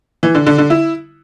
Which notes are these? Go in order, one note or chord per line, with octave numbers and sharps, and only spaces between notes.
E3
D3
D3
D3
E4